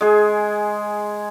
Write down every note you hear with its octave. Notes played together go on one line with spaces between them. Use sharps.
G#3 G#4